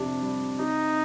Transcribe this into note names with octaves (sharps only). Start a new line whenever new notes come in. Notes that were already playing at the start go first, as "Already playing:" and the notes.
Already playing: F2 C3 D4
G3
C3 D#4